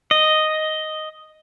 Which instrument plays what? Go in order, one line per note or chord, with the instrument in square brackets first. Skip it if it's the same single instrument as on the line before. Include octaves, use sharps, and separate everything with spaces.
[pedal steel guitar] D#5